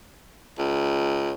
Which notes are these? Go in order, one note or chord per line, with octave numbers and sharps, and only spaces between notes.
C#2